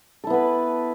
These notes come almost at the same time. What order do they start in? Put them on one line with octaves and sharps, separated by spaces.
A4 E4 B3 B4